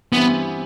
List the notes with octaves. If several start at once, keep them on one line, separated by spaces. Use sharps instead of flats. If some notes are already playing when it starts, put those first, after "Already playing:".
G2 E3 G3 B3 C4 E4